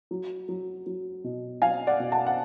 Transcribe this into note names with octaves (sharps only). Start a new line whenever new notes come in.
F#3
F#3
F#3
B2
F#3 F5 G#5
D5 F#5
B2
F#5 A5
F#5